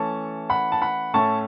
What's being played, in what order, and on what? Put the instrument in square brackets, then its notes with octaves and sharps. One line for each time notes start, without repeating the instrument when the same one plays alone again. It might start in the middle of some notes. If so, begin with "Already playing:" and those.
Already playing: [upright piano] E3 A3 C#4 A5 C#6
F#5 B5
A5
F#5 B5
A2 A3 C#4 A5 C#6